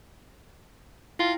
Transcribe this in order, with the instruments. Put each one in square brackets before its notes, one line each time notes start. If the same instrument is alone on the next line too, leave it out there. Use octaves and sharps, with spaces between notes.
[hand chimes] E4 G5 C7 [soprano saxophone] F4